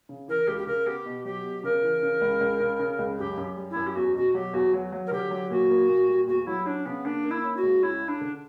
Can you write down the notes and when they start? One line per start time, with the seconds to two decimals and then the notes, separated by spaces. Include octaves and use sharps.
0.09 C#3
0.28 E3 A#4
0.47 C#2 G4
0.58 G4
0.67 C#3 A#4
0.86 B3 G4
1.06 B2
1.25 F#3 G4
1.44 B2
1.63 C#3 A#4
1.83 E3
2.03 C#3
2.21 C#2
2.41 C#2
2.60 C#3
2.80 C#3
2.99 C#2
3.18 F#2 G4
3.37 F#2
3.56 G3
3.70 E4
3.76 F#2
3.86 G4
3.95 E2 F#4
4.15 B2 F#4
4.34 F#3 G4
4.53 E2 F#4
4.73 F#3
4.92 F#3
5.06 A#4
5.11 D3 G4
5.31 F#3
5.50 A#2 F#4
5.70 A#3
5.89 A#2
6.08 G3
6.27 E2 F#4
6.46 F#3 E4
6.65 C#4 D4
6.85 C#3 B3
7.05 A#3 D4
7.24 A#3
7.30 E4
7.43 C#4
7.56 F#4
7.63 C#2
7.82 C#4 E4
8.02 C#4
8.08 D4
8.21 D3